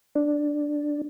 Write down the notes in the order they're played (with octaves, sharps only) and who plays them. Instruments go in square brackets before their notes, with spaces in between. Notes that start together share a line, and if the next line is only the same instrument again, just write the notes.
[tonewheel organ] D4